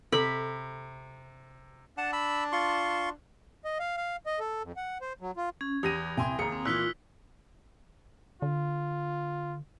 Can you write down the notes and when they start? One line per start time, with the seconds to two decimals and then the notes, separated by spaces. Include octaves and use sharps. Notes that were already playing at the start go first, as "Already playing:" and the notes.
0.12 C3 A4 B5
1.98 D4 F#5 A5
2.13 B5 E6
2.52 F4 C6 C#6
3.65 D#5
3.80 F5
3.97 F5
4.26 D#5
4.39 A4
4.63 F2
4.77 F#5
5.01 C5
5.20 F#3
5.37 F4
5.61 C#4 G#6
5.83 E2 G4 B5 D#6 A#6 D#7
6.17 C2 G5 G#5 C6
6.39 D#2 G#4 A#5 C#7
6.52 C4
6.65 A#2 E3 E4 F4 E6 F#6 B6 G7
8.42 D3 F4